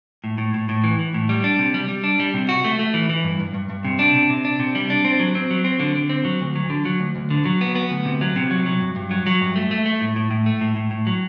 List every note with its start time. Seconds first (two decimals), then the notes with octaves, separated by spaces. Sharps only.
0.24 A2
0.38 A2
0.54 A2
0.69 A2
0.84 E3
0.99 E3
1.14 A2
1.29 G3
1.44 D4
1.59 C3
1.74 G3
1.88 G3
2.04 D4
2.20 G3
2.34 C3
2.49 F#4
2.64 A3
2.79 A3
2.94 E3
3.09 E3
3.24 G2
3.40 G2
3.54 G2
3.70 G2
3.85 C3
3.99 D4
4.15 C3
4.30 C3
4.45 D4
4.60 C3
4.75 G3
4.90 D4
5.05 C4
5.20 F#3
5.35 C4
5.51 F#3
5.65 C4
5.80 D3
5.95 D3
6.10 C4
6.25 F#3
6.41 D2
6.55 F#3
6.70 D3
6.85 F#3
7.00 D2
7.16 D2
7.30 D3
7.45 F#3
7.61 B3
7.75 B3
7.90 D2
8.05 C3
8.21 F#3
8.36 C3
8.51 F#3
8.66 F#3
8.81 G2
8.96 G2
9.11 F#3
9.26 F#3
9.41 G2
9.56 A3
9.71 A3
9.86 A3
10.01 A2
10.16 A2
10.31 A2
10.46 A3
10.61 A2
10.76 A2
10.91 A2
11.07 F#3